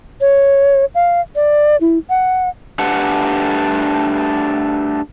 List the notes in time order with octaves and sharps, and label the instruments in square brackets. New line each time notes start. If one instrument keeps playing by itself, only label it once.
[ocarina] C#5
F5
D5
E4
F#5
[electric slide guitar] A3 D4 G4 B4 F#5